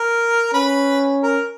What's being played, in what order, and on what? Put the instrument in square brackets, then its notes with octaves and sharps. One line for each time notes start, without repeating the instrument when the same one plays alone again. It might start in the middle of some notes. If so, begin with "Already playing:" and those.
Already playing: [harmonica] A#4
[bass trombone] C#4 [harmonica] B4
[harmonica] A#4